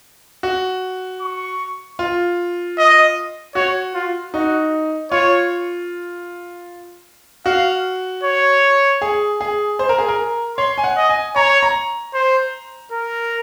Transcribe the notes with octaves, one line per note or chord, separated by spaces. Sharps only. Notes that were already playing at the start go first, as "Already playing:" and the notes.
F#4
C#6
F4
D#5
F#4 C#5
F4
D#4 F#4
F4 C#5
F#4 F5
C#5
G#4
G#4
C5
A#4
G#4
A#4
C#5 C6
G#5
F#5
D#5
G#5
C#5 A#5
A#5
C5
A#4